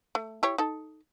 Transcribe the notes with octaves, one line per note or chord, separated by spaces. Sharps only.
A3
E4 G4 C#5
D#4 A4